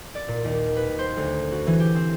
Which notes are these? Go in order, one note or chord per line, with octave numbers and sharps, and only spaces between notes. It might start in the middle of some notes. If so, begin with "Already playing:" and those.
D5
A#2
D#2
B4
C5
D2
F#4
E3
G4
C4